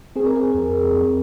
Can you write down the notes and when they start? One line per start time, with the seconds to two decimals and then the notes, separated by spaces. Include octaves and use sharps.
0.16 C4 G#4
0.26 A#4
0.35 G#4
0.55 F2
0.93 F2